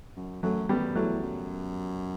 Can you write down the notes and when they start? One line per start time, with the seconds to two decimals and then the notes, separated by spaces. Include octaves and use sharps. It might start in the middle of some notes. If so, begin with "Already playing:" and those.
0.17 F#2
0.43 F#2 F#3 A3
0.69 F#2 G3 B3
0.95 E2 F#3 A3
1.22 F#2